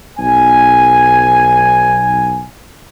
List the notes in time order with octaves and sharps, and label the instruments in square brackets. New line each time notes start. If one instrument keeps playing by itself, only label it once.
[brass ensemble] B1 G#5